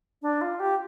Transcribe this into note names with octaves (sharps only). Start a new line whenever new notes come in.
D4
F4
G4